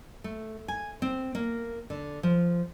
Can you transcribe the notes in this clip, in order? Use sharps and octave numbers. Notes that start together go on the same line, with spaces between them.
A3
G#5
C4
A#3
D3
F3